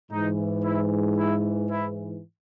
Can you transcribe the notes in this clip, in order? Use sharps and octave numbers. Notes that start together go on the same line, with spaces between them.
G#2 E3 D#4
E4
E4
E4